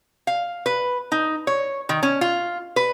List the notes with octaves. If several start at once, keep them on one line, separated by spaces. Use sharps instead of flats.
F5
B4
D#4
C#5
D#3
C#4
F4
B4